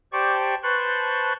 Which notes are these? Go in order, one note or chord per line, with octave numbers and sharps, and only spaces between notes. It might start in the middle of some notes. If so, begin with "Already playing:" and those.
G4 C5 D5 G5 A5 C#6
B4 C5 A5 C6 C#6 F#6